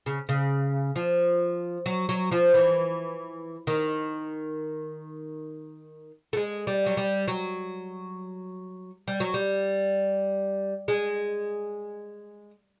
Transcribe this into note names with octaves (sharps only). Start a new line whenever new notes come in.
C#3
C#3
F3
F#3
F#3
F3
E3
D#3
A3
G#3
G3
F#3
G3
F#3
G3
F#3
G3
G#3